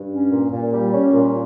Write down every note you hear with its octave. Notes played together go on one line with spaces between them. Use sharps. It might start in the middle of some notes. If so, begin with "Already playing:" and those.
Already playing: G2
C#4
A#2
A#2
G3
C#4
A#2